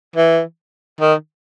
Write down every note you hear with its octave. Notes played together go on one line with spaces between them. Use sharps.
E3
D#3